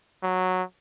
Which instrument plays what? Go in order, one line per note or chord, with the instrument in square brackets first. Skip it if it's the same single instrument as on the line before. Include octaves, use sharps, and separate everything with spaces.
[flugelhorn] F#3